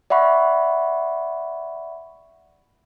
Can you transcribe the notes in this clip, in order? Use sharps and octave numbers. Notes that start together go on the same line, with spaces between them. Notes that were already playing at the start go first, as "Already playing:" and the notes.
D5 E5 F#5 B5 C#6